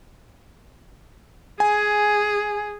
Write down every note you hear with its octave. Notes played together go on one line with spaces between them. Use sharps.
G#4 G#5